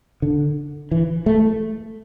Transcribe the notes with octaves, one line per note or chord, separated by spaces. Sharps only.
D3
E3
A3